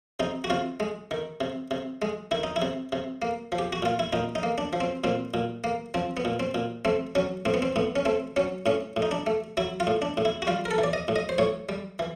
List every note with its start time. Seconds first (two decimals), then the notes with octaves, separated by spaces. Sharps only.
0.20 C3 D#4
0.44 F#4
0.50 C3 F4
0.80 G#3
1.11 D#3
1.41 C3
1.71 C3
2.02 G#3
2.31 D#3 E4
2.43 D#4
2.56 E4
2.62 C3
2.92 C3
3.22 A#3
3.52 F3
3.59 G4
3.73 F#4
3.82 A#2 F4
3.99 E4
4.13 A#2 D#4
4.35 D#4
4.43 A#3
4.58 D4
4.73 F3
4.80 C4
5.04 A#2 C4
5.34 A#2
5.64 A#3
5.94 F3 C4
6.17 B3
6.25 A#2
6.40 C4
6.55 A#2
6.85 A3 C4
7.15 F#3 C#4
7.45 A2 C4
7.54 B3
7.62 C4
7.76 A2 B3
7.96 C#4
8.05 A3 C4
8.36 F#3 C#4
8.66 A2 C#4
8.96 A2
9.02 D#4
9.11 D4
9.26 A3
9.57 F#3 E4
9.80 F4
9.87 A2
10.02 D4
10.17 A2
10.25 E4
10.42 F#4
10.47 G3 F4
10.65 A#4
10.71 A4
10.78 E3
10.83 D5
10.93 D#5
11.08 A2
11.16 D#5
11.29 C5
11.38 A2 C#5
11.69 G3
11.99 E3